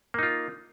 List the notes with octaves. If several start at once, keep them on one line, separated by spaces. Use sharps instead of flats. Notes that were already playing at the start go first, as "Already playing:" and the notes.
A#3 D#4 F4